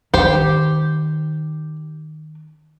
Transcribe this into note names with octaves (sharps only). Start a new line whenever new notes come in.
D#3 G4 C5